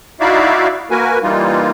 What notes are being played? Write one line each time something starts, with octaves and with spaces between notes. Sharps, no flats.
D#4 E4 F#4 D5 E5 F5
A#3 F#4 A#4 B4 G#5
E3 G3 A#3 D#4 F4